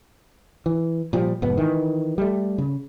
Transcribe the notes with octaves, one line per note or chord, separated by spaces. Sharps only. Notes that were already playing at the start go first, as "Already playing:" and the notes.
E3
A#2 F3 G3
F1 G#2 B3
D#3 E3
G3 A3
C#3